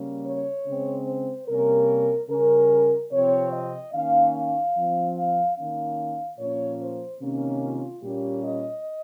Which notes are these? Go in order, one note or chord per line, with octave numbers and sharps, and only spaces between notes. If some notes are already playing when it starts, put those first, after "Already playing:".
Already playing: C#3 G3 A#3 C#4
C#5
C#3 G#3 C4
C5
C3 G3 A#3 C#4 A#4
C#3 G3 C#4 A#4
C3 F3 C4 C#5
D#5
D#3 A#3 C#4 F5
F5
F3 C4
F5
D#3 A#3 C#4 F5
A#2 F3 A#3 C#4 C#5
C5
C3 D#3 A#3 C#4
F4
A#2 G3 A#3 C#4 G4
D#5